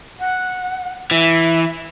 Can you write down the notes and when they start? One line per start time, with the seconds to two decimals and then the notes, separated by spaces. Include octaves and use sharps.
0.20 F#5
1.11 E3 E5